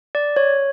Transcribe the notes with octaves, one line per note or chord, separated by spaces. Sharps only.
D5
C#5